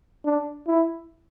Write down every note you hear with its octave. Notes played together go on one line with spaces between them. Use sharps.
D4
E4